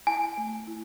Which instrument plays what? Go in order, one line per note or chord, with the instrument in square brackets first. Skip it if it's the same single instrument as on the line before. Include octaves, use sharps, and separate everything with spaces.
[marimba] E4 [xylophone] G#5
[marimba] A3
E4